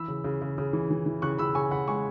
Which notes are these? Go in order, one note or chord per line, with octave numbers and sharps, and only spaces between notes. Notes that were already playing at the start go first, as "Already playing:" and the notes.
Already playing: E3 B5 E6
C#3
C#3
C#3
C#3
E3
E3
E3
C#3 C#6 F#6
C#3 B5 E6
C#3 G#5 C#6
C#3 F#5 B5
G#3 G#5 C#6